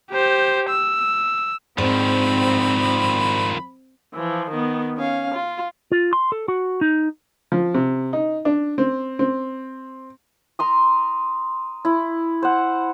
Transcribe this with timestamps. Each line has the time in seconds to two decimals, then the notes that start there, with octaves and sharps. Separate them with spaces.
0.11 G4 C5
0.70 E6
1.78 G#2 D#3 F3 C4 D5 B5
4.14 E3 F3
4.50 D#3 B3
4.98 C#4 F5
5.34 F4
5.92 F4
6.13 C6
6.32 A4
6.48 F#4
6.81 D#4
7.52 F3
7.74 C3
8.13 D#4
8.45 D4
8.78 C4
9.19 C4
10.59 A#5 C6 D#6
11.85 E4
12.43 C5 F#5